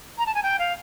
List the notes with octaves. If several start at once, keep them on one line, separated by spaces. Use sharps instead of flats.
A#5
A5
G#5
G5
F5